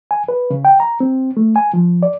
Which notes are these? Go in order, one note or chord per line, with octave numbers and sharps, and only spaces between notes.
G#5
B4
C#3
G5
A#5
C4
A3
G#5
F3
D5